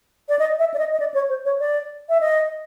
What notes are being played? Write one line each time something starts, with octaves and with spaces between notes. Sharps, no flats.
D5
D#5
E5
D5
D#5
D#5
D5
C#5
C5
C#5
D5
E5
D#5